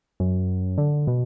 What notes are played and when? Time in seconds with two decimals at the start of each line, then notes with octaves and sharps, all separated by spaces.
0.20 F#2
0.78 D3
1.07 B2